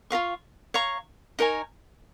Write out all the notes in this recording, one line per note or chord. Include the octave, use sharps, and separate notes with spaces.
F4 A#4 F5 C#6
C#5 F5 A#5 C#6
D#4 A#4 C#5 G#5